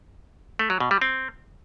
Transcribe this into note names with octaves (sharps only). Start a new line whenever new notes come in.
A3
F#3
B2
G3
C4